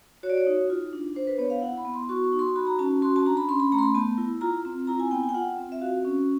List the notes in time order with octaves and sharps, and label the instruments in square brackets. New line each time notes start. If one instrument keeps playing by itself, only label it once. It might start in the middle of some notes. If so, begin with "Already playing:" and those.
[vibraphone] F#4 C#5
D5
C#5
D#4
F4
D4
D4 C5
B4
B3 C#5
F5
E4 F#5
B5
B3
C6
F#4 C#6
C#6
D#4
C6
F#4 B5
A#5
C#4 A5
F#4 C6
A5
D4 A#5
B5
C#4 C6
B5
A3 A#5
C6
B5
B3 A5
E4
F4 A#5
C4
E4 A#5
G#5
B3 G5
G#5
G5
F4 F#5
C4
E5
F#4 F5
C#4